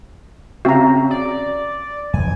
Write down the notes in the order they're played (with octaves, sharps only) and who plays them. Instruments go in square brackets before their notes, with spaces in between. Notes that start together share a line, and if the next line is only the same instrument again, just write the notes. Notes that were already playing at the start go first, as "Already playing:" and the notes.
[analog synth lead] C#3 [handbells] C4 F#4 [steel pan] E5 F5 A#5
[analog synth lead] D5
[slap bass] F2 E3 G#3 [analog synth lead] G#5